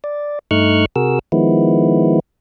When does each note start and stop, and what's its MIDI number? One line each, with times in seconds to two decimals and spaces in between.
0.04 0.39 74
0.51 0.86 43
0.51 0.86 57
0.51 0.86 63
0.51 0.86 85
0.51 0.86 89
0.51 0.86 90
0.96 1.19 48
0.96 1.19 66
0.96 1.19 68
0.96 1.19 70
0.96 1.19 88
1.32 2.20 51
1.32 2.20 53
1.32 2.20 56
1.32 2.20 59
1.32 2.20 64